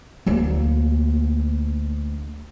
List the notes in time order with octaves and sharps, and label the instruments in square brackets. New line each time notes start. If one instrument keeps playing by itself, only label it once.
[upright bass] D2 A#3